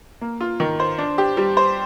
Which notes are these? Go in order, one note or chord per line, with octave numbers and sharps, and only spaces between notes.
A#3
F4
D#3
C5
D4
G4
G3
C5